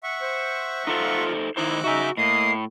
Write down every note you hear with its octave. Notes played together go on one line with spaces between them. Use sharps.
E5 F#5 C#6
C5
D#4 F4 A4 C5
D#3 D#4 E4 C5 D6 E6 F#6
C#3 D#4 F#4 E5 G#5
A2 A#3 D#5 D#6 C7